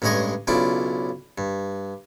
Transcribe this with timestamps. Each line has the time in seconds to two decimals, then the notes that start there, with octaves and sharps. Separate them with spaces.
0.02 A1 G2 G#3 G#4 C#5 D#5
0.47 B1 C#3 D4 E4 F4 D6
1.38 G2